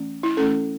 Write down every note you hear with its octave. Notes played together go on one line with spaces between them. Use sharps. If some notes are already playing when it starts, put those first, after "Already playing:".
Already playing: E3 A3 C#4
E4
E3 A3 C#4 A4